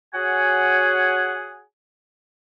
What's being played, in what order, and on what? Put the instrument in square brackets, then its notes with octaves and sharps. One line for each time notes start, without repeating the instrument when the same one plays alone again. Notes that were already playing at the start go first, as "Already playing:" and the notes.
[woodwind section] F#4 G#4 C#5 F#5 G#5